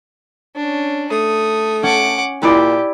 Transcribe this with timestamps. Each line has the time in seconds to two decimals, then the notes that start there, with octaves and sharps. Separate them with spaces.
0.55 C#4 D4
1.12 A3 D#6
1.83 C#4 F#5 D6
2.43 A#2 E4 G4 D5